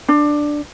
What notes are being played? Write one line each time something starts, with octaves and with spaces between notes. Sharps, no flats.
D4